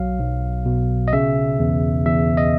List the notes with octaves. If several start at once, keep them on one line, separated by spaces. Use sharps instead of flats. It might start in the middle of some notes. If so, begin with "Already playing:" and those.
Already playing: B1 F#3 F5
B1
B2
D#5
C#3 E5
E2
E2 E5
D#5